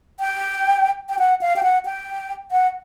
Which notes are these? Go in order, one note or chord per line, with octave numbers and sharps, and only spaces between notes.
G5
G5
F#5
F5
G5
F#5
G5
F#5